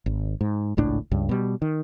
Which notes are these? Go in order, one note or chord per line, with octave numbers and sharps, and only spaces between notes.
G#1
G#2
G#1 C#2 A2 D4
C#2 G2
B2 G3
D#3